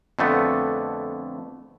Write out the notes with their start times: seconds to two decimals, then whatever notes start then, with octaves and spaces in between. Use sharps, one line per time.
0.19 F2 D3 A3 B3